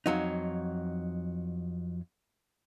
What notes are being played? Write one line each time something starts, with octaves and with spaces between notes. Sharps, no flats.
F2 F#3 D#4